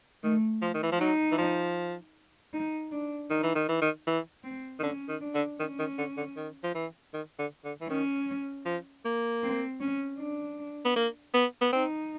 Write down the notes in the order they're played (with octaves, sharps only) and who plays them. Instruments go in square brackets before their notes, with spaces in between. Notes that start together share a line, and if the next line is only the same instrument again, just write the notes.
[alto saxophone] D#3 [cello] A3
[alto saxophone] F3
D#3
E3
F3
[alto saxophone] F#3 [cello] D#4
[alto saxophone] E3
F3
[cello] D#4
D4
[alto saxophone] D#3 [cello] D#4
[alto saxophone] E3
D#3
E3
D#3
E3
[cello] C4
[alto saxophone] D#3
[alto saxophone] D3 [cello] C#4
[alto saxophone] D#3
[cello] D4
[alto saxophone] D3
[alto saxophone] D#3 [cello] C#4
[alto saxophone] D#3
D3
D3
D#3
F3
E3
D#3
D3
D3
E3
[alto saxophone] D#3 [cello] C#4
[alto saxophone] F3
A#3
[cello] C4
C#4
D4
[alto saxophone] B3
A#3
B3
B3
[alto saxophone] C4 [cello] D#4